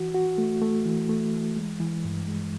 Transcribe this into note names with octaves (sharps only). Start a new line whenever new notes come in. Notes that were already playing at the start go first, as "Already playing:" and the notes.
Already playing: E3 F#4
F#4
A3
A3
E3
A3
E3
G#3
E3
G2
G#3